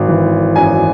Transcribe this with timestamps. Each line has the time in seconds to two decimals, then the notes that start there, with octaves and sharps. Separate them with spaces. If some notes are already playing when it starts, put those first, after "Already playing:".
Already playing: G#1
0.08 E3
0.56 F#2 G#5